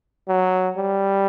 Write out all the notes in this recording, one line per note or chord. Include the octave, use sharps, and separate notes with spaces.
F#3
G3